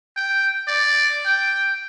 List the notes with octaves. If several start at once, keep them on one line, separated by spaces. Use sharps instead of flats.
G5
D5
G5